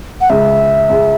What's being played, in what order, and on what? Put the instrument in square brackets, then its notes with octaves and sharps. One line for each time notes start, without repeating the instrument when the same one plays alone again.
[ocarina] F#5
[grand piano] C#2 C#3 G#3 [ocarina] E5
[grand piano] C#2 C#3 G#3